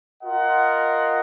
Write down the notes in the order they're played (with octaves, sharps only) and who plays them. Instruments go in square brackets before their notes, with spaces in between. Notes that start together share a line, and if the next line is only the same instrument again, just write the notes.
[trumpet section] F4 A#4 D#5 F#5